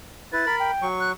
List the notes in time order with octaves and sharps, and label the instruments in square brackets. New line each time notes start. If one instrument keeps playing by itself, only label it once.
[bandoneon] E4 B4 [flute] A6
[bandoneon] A#4 B5
[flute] G5
[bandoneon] F#3 C#6
[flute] F#6